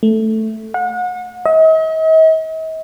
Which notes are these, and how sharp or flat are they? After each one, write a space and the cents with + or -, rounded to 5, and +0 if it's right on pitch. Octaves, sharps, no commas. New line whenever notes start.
A3 +0
F#5 -35
D#5 +45